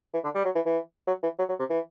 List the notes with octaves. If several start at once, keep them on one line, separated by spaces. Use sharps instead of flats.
E3
D3
G3
F#3
E3
E3
F#3
E3
F#3
F#3
C3
E3